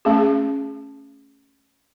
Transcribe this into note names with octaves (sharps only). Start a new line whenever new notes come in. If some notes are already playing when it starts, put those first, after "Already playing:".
A3 C#4 G#4